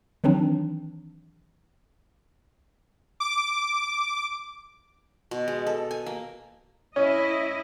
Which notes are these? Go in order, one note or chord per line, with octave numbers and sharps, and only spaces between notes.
D#3 E3 F#3 C4 D4 D#4
D6
B2
G#3
A4
G#5
A#3
C#4 E4 D#5